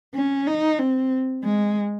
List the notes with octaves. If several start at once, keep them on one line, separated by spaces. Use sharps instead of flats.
C#4
D#4
C4
G#3